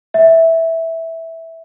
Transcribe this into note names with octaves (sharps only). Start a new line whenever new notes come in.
E5